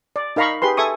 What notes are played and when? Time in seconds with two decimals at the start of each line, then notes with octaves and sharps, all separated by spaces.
0.16 D5
0.36 D#4 A#4 F5 A#5 B5 C#6
0.62 G4 G#4 B4 C6
0.77 A4 E5 G#5 C#6 D#6